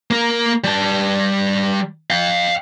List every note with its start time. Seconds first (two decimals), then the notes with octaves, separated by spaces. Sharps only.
0.11 A#3 A#4
0.64 G3 A5
2.10 F5 G5